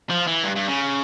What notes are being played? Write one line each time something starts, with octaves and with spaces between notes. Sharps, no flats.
F3
E3
G2
G2
C#3